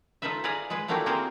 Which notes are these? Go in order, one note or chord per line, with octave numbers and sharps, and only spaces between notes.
D#4 F4 A4 B4 E5
G#4 B4 D5 F5 G#5 A#5
G#3 G#4 B4
A3 A#3 D4 E4 F#4 G4
A#3 C4 G#4 A#4 C5